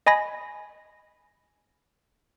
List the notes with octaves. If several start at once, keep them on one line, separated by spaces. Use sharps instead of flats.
D#5 G#5 B5 A#6